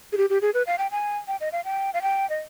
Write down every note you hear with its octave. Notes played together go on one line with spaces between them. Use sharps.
G#4
G4
G4
G#4
B4
F5
G5
G#5
G5
D#5
F5
G5
F5
G5
D#5